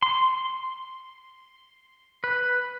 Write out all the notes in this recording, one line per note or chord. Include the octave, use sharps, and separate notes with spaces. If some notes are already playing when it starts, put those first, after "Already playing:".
C6
B4